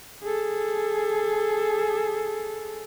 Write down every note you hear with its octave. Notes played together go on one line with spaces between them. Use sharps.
G#4 A4